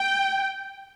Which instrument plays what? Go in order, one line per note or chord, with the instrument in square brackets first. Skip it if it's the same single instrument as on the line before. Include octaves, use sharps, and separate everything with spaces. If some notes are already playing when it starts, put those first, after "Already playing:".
Already playing: [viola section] G5